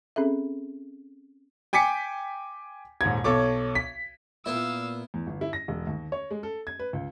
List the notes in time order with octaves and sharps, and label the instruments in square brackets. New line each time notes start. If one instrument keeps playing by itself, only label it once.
[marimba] C4 C#4 G#4 A4 E5
[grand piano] G5 G#5 D6 B6 C#7
D#1 G#2 G#6
B1 A4 C#5 D6
B6
[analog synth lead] A#2 [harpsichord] B3 E4 [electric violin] F5 E6
[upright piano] E2
G1
E4
A#6
E1
D#2
C#5
G#3
A4
G#6
B4
C#2